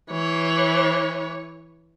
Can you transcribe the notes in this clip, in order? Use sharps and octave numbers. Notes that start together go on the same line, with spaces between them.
E3 C#5